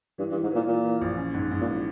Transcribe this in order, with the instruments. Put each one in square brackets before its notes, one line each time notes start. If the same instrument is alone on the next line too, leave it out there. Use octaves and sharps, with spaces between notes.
[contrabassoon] G2 [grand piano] E3
[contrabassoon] G2
[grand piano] E3
[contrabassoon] G#2
[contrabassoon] A#2 [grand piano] E3
[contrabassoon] A#2 [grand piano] E3
[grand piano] E3
A#1
C#4
G#2
G#2
[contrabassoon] A#2
[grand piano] E3